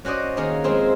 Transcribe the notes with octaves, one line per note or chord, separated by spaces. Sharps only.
C#4 F#4 C5 D5 D#5
D#3 A#3 C#4 G#4
F3 G#3 C4 E4 F4